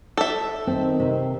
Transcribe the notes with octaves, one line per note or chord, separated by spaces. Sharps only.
A4 E5
D#3 C4
C3